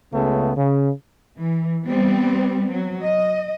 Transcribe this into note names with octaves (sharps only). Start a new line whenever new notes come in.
C#2 C#3 A3 B3
C#3
E3
G3 B3 C4
F#3
D#5